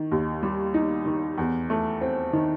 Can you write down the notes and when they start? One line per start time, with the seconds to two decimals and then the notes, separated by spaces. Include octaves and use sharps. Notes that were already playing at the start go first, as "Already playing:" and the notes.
Already playing: D#3
0.12 D#2
0.43 G3
0.74 D#4
1.06 D#3
1.38 E2
1.70 A3
2.01 C4
2.33 D#3